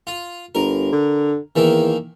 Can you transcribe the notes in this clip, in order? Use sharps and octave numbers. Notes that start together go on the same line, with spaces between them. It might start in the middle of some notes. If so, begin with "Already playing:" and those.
F4
G1 A#4
D3
E2 D#3 E3 A#3